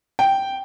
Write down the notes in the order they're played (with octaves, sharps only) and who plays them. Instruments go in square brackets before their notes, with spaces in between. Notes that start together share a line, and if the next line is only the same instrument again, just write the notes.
[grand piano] G5